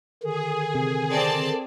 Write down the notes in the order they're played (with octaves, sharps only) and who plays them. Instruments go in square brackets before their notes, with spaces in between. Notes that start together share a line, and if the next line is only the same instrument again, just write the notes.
[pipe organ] D3 D#3 [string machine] G#4
[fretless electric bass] C3
[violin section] C4 D5 A5